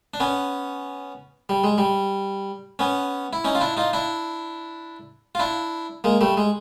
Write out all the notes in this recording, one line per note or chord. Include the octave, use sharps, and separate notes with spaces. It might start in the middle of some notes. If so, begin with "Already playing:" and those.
D4
B3 C#4
G3
G#3
G3
B3 C#4
E4
C#4 D#4
F4
D4 E4
D#4 F4
D4 E4
F4
D4 E4
G#3 A#3
G3 A3
G#3